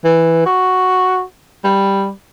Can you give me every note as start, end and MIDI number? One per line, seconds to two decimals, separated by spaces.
0.05 0.41 52
0.46 1.23 66
1.64 2.10 55